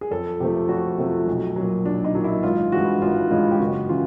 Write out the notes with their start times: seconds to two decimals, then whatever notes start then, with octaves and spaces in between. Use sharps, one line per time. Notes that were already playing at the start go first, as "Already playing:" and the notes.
0.01 G#4
0.11 F2 A4
0.40 C3 F3 A3 G4
0.69 F2 F#4
0.98 C3 F3 A3
1.27 B1
1.56 A#2 F#3
1.85 B1 D4
2.05 D#4
2.15 A#2 F#3
2.24 E4
2.43 G#1 F4
2.72 G2 E3 G#3 F#4
3.02 G#1 F4
3.31 G2 E3 G#3 F4
3.51 G4
3.59 F#1 F#4
3.89 C#3 E3 F4